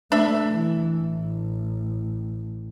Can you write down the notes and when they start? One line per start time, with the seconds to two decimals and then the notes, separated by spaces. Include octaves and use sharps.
0.12 A3 D4 E5
0.48 E3
1.01 A1